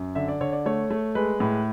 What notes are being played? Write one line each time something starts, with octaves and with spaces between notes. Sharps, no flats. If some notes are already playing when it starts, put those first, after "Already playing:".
Already playing: F#2
D3 E5
D5
D3 C#5
D5
A3 C#5
A3
G#3 B4
A2